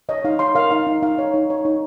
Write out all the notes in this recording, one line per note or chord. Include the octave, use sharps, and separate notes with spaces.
C#5 D#5
D#4 F5
C#5 C6
A#4 F5
D#4 F5
D#4
D#4 F5
C#5
D#4
C#5
D#4